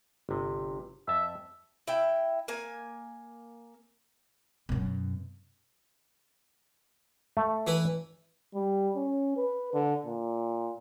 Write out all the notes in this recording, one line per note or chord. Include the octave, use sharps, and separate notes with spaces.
G1 C3
F2 E5 A5
E4 G5
A#3 G#5
F#2 B2
A3
E3 E4 B4
G3
C#4
B4
D3
A#2